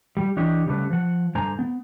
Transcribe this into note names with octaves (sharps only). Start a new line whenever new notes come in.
G3
E3 D4 G4 C#5 D#5
C#3 G3 A3 B4
F3 F#5
G2 D3 C5 G#5 A#5
B3